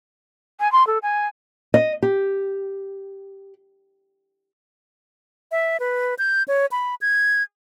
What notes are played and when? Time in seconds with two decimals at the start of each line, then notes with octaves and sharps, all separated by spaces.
0.60 G#5
0.72 C6
0.87 A4
1.03 G#5
1.74 D#5
2.02 G4
5.52 E5
5.80 B4
6.19 G6
6.48 C#5
6.72 B5
7.01 G#6